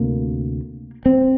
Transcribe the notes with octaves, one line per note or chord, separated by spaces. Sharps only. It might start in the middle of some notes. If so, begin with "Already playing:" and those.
Already playing: D2 C3 A#3
C4